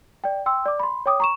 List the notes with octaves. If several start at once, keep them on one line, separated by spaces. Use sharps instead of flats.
D5 G5
G5 C6 E6
D5 D6
B5 C6
C#5 G5 D6 D#6
A#5 C#6 E7